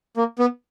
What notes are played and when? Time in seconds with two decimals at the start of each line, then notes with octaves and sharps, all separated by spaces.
0.17 A#3
0.39 B3